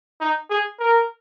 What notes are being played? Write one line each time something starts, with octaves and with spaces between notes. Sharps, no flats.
D#4
G#4
A#4